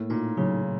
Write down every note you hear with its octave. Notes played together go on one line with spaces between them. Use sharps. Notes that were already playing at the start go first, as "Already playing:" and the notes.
Already playing: A2 A#3
A#2 D#4
C#3 F#3